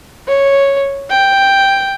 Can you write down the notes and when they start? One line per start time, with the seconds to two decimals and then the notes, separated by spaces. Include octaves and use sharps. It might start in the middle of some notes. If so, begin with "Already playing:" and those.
0.28 C#5
1.10 G5